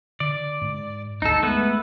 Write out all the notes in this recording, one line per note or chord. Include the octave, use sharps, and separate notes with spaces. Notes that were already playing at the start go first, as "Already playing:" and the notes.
D3 D5
G#2
G#1 D2 D#4 A4
G#3 A3 B3 B4